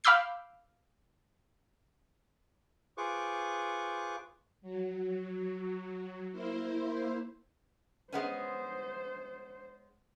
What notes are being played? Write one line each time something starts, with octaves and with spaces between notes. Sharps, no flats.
F5 B5 D6 E6 G6 C7
F4 G#4 B4 C5 C#6 D6
F#3
A#3 E4 C5
G#3 B3 C#4 C5